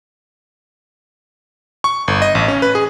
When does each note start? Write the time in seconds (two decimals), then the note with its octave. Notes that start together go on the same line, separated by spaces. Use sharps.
1.84 C#6
2.08 G1
2.22 D#5
2.35 A1
2.48 C#4
2.62 B4
2.75 G#4